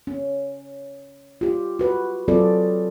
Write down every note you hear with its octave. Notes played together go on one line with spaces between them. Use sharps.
C#4
F4 G4
F#4 B4
F#3 C4 F4 G#4 A4 D5